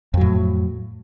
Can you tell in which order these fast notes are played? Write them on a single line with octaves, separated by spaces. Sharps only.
F2 F#3 A2